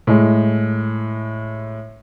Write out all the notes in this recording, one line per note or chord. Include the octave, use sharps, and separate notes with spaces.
A2 G#3